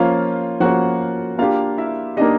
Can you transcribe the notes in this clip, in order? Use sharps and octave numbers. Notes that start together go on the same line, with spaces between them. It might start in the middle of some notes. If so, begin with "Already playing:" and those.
Already playing: F3 A#3 C#4 F4 F5
F3 A#3 C#4 F#4 F#5
A#3 D4 F4 G4 F5
E4 E5
A#3 D4 D#4 G4 D#5